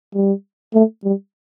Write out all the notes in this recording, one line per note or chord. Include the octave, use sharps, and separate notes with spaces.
G3
A3
G3